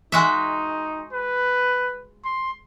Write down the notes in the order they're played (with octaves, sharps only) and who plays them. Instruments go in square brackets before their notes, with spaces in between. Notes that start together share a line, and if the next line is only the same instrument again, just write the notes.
[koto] G#3 F#4 E5 [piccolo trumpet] D#4
[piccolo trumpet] B4
C6